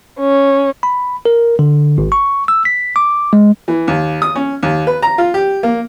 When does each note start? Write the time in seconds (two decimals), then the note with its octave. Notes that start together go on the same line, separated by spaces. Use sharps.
0.17 C#4
0.83 B5
1.25 A#4
1.59 D3
1.98 G#1
2.12 C#6
2.48 E6
2.65 B6
2.96 D6
3.33 G#3
3.68 E3
3.88 D#2
4.22 D#6
4.36 C#4
4.63 D#2
4.87 B4
5.02 A#5
5.18 F4
5.34 G4
5.63 A#3